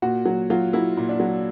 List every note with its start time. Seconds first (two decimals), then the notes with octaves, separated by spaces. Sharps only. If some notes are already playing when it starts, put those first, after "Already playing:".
0.02 A#2 F#4
0.26 F#3
0.50 F#3 F4
0.73 F#3 E4
0.97 A#2
1.09 D4
1.20 F#3